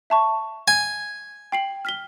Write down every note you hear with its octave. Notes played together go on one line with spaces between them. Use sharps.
E5 A5 C#6
G#5
G5 C7 F#7
F6 B6 G7